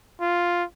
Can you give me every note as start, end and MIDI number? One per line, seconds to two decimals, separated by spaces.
0.21 0.64 65